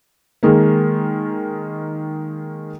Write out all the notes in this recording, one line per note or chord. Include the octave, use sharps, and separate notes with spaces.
D#3 G#3 A#3